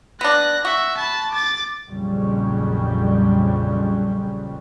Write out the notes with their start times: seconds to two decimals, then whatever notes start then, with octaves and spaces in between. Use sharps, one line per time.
0.21 B3 D4 F#6 A#6
0.65 F#4 E5
0.97 A5 B5
1.31 D6 A6
1.89 A#1 F2 C#3 F#3 G3